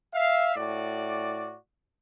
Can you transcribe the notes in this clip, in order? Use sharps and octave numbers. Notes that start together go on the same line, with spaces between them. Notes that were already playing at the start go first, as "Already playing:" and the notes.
E5 F5
A2 F#4 D5